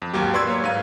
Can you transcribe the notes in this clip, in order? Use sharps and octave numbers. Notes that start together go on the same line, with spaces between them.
F2
D#2 G#2 F#3 A#3 G4
B4 D5 C6 C#6 E6 G#6
A#3 B4 C#5
G#2 F5 D#7